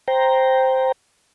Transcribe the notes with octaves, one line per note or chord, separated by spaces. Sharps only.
C5 G5 A#5